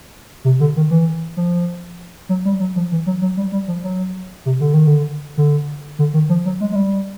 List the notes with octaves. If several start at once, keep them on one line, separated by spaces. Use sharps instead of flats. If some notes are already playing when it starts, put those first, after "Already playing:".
C3
D3
D#3
E3
F3
F#3
G3
F#3
F3
E3
F#3
F#3
G3
G3
F3
F#3
C3
D3
D#3
D3
D3
D3
D#3
F3
F#3
G#3
G#3
G3